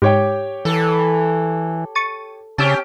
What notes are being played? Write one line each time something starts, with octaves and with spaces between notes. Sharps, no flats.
G#2 G4 C#5 G5
E3 A4
C#6 A6 D#7
C#3 C4 C#4 G4 A5 E6 D7